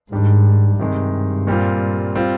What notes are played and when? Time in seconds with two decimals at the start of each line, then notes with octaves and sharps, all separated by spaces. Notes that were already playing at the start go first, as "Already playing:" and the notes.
0.11 G#2 D#3 G3 D4
0.79 G2 C3 D#3 G#3
1.47 A#2 G3 C4 F4
2.15 G3 C4 F4